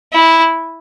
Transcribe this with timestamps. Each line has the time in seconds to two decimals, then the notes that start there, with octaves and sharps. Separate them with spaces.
0.13 E4